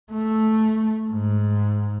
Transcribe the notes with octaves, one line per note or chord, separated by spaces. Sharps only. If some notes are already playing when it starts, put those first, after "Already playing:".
A3
G#2